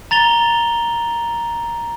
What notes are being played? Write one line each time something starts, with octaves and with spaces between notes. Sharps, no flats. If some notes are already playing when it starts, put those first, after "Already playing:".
A#5 A6 F7 G7